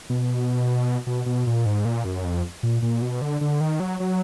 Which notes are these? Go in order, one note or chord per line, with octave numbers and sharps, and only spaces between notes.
B2
B2
B2
A#2
G#2
A#2
F#2
F2
A#2
A#2
B2
D3
D3
D#3
F#3
F#3